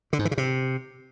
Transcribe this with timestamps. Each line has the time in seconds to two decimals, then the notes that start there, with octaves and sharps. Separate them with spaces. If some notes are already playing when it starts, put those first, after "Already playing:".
0.13 D3
0.19 G#2
0.25 E3
0.31 C#3
0.38 C3